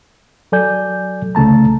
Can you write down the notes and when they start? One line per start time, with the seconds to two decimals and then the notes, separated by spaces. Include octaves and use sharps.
0.52 F#3 A4 D5 G#5 G6
1.35 C2 C#3 A3 A5 A#5